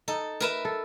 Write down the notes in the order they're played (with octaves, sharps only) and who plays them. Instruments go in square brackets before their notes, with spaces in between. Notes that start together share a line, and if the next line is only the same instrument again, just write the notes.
[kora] D#4 [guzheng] A4
[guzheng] A#4 B4 E5
[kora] A4